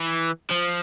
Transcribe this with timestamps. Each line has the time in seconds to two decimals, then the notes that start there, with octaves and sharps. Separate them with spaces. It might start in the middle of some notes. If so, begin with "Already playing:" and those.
Already playing: E3
0.50 F3